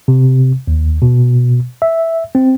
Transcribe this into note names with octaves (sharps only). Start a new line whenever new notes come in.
C3
D#2
B2
E5
C4